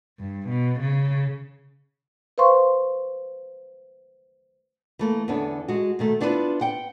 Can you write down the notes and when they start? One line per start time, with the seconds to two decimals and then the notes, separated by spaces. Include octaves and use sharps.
0.19 G2
0.49 B2
0.80 C#3
2.38 B4 C5 F5 C6 C#6
4.99 E3 A3 A#3
5.28 E2 D3 B3 C#4 D4
5.68 G#3 F#4
5.99 B2 D#3 A3
6.21 B3 D4 E4 F4 G4 B4
6.61 F#5 G5